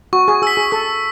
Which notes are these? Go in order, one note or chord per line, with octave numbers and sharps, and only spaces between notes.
F#4 C#6
G#4
G#4 E6 B6
G#4
A4 C#6